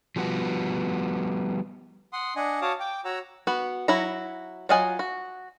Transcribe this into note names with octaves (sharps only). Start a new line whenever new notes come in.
F3 G3 B3 F#4
F#5 C6 D#6
D4 D#5 F#5 G#5
F#4 C#5 F5 A5 D6 D#6
G5 D6
F#4 C#5 F#5 A#5 E6
B3 F#4
F#3 E4 F#4 A#5
F#3 F4 D#5 F#5 G#5
F#4